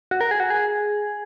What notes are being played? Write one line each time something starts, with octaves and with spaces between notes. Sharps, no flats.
F#4
A#4
G#4
F#4
G#4